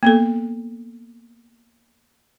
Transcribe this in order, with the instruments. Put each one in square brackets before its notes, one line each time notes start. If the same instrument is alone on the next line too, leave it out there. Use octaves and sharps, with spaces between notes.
[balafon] A#3 B3 A4